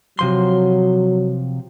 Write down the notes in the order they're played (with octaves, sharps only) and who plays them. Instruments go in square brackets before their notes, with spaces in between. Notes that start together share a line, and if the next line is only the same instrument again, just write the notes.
[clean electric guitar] C3 F3 C6 [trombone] F#3